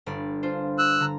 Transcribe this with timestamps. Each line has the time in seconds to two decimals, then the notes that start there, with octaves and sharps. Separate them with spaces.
0.06 G1 G2 D5
0.43 D4 F4 C5
0.78 E6 F#6
1.00 D3 A#5